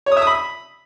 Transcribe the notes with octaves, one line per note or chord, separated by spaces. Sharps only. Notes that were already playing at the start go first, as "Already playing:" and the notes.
C#5
D#6
E5
D#6
B5